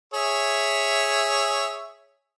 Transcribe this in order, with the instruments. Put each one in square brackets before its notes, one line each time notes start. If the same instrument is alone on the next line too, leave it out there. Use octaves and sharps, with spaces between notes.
[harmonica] G#4 C#5 E5